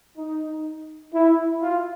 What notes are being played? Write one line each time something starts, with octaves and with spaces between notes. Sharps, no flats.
D#4
E4
F4